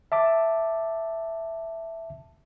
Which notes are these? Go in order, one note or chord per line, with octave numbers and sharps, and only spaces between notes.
E5 A5 D6